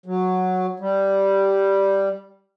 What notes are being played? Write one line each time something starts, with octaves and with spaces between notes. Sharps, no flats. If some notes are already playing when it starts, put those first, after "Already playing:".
F#3
G3